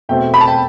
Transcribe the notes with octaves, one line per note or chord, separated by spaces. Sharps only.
E2 B2 A3 C4 G5
B5
A5
G5